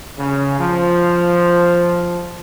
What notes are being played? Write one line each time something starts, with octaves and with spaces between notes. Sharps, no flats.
C#3
F3